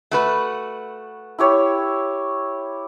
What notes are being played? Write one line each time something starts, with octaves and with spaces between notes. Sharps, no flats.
A3 F#4 B4
E4 G4 C#5